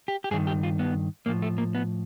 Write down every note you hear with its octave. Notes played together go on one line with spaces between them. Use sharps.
G4
G4
G2 D#3 G#4
G4
F4
B3
A2 F3 A#3
A3
A#3
B3